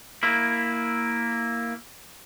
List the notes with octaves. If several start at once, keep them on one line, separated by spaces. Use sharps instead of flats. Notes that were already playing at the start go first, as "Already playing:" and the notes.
A#3 E4